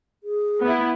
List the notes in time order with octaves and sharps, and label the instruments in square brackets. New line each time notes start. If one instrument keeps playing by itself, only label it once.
[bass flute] G#4
[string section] B3 E4